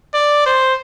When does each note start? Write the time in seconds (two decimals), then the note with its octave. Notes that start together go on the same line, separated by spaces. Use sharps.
0.14 D5
0.46 C5